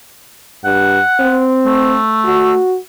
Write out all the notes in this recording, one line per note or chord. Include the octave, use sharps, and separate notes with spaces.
G2 F#5
C4
A3
F#4